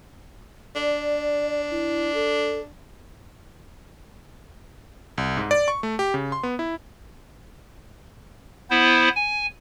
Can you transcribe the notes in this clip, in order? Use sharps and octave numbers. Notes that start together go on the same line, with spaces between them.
D4 D5
E4
A4
C2
G#2
D5
C#6
A3
G4
C#3
C6
B3
E4
B3 E4 C5
G#5